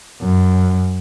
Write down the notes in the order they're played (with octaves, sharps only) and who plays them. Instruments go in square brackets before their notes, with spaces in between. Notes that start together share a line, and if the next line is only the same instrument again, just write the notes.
[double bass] F#2